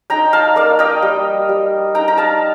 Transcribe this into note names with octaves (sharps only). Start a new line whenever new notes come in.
D#4 G5 A#5
F5 A5
A#3 D5 F5
D#5 G5
G3
G3
D#4 G5 A#5
A#5
F5 A5